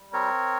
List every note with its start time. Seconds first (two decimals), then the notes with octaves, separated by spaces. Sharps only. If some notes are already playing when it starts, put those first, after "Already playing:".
Already playing: G3
0.13 C4 A#4 C#5